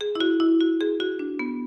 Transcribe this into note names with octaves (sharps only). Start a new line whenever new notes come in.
G#4
E4
F#4
E4
F#4
G#4
F#4
D4
B3